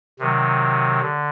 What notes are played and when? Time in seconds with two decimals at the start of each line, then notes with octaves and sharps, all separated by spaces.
0.19 C3 D#3 F#3
1.01 D3